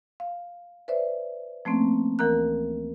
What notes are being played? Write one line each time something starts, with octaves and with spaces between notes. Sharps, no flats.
F5
B4 C5 D5 E5
F3 A3 A#3 C4 C#4
D2 E3 A#4 A#5 F#6